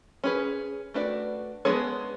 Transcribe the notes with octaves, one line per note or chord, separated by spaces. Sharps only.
C#4 G#4 B4
A3 D4 F#4 B4 D5
G#3 B3 D4 G#4 C#5